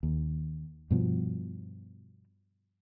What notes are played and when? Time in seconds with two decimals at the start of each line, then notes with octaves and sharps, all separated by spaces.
0.03 D#2
0.90 G2 B2 F3